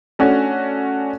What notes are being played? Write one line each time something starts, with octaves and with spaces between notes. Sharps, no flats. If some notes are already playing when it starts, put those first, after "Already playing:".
A3 C#4 D4 F#4